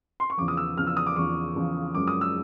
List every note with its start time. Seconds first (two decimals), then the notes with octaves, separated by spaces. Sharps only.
0.20 C6
0.30 C#6
0.37 E2 C#3 F3 D6
0.48 D#6
0.57 E6
0.77 E2 C#3 F3 F6
0.87 E6
0.97 D#6
1.07 D6
1.16 E2 C#3 F3 C#6
1.56 E2 C#3 F3
1.95 F#2 C#3 F3 G#3 D6
2.08 D#6
2.21 E6